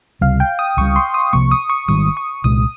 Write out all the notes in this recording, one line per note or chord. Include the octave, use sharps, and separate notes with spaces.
C#2 C3 G3 F5
G5
D#6
C#2 C#3 G3 C#6
C6
D#6
C2 C3 F3 A#3 C#6
D#6
C#6
G#1 G#2 D#3 G3 D#6
C#6
C2 A#2 G#3 D#6